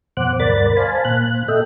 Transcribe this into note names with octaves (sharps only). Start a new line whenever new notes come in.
F2 B2 C5 F#5 D6 F#6
D2 G2 A#4 D5 B5 A6
C5 F5 G#5 A5 B5
A#2 F#6
A4 D#5 E5 G5